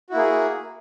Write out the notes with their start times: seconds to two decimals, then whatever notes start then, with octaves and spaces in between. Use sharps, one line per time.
0.10 F#4
0.12 E4
0.15 A#3
0.17 G#4